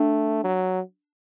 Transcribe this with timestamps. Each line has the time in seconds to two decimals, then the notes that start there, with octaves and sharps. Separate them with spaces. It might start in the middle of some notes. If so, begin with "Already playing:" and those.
Already playing: A3 D4
0.44 F#3